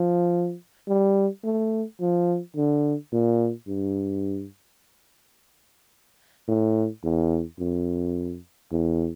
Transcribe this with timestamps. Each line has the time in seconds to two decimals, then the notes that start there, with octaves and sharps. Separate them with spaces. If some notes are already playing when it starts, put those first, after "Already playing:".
Already playing: F3
0.88 G3
1.44 A3
2.00 F3
2.56 D3
3.12 A#2
3.68 G2
6.48 A2
7.04 E2
7.59 F2
8.71 E2